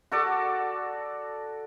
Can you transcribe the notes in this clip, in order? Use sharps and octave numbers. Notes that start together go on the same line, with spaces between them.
F#4 A4 D5